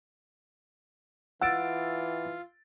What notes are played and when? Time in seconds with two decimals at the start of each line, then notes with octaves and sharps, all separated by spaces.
1.42 E3 F4 F#5 E6 A6 D7